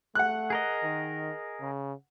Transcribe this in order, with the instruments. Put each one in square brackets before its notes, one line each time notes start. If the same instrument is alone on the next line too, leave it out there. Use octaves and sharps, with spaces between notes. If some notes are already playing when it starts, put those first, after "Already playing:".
[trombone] A3 [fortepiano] F#5 F#6
[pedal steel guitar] G#4 A#4 D#5
[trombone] D#3
C#3